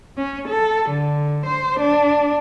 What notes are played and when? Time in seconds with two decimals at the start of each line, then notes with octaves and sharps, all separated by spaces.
0.17 C#4
0.48 A4
0.89 D3
1.46 C5
1.80 D4